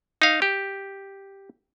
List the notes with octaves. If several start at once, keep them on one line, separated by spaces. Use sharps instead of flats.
D#4 F5
G4